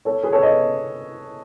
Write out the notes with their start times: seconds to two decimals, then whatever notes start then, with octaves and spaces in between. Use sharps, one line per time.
0.05 A4 C#5
0.23 G#4 B4
0.32 A4 C#5
0.42 B4 D#5